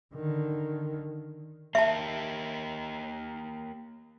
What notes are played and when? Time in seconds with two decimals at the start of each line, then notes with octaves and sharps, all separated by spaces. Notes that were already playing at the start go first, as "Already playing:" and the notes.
0.15 D3 D#3
1.75 A#3 G4 E5 A5